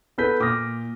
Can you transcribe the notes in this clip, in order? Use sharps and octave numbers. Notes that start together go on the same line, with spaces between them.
B3 A4 B4 G6 B6
A#2 D6 D#6 F6 A#6